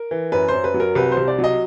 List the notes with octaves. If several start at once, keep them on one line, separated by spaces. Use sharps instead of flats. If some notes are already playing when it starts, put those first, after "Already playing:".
Already playing: A#4
E3
F#2 B4
F#2 C5
B4
F#3
A#4
C2 B4
C5
C2
D5
F#3
D#5